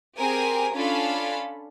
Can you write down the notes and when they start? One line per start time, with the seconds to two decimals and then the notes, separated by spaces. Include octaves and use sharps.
0.17 C4 G4 G#4 A#4 G#5
0.74 C#4 D4 F4 A4 F5 B5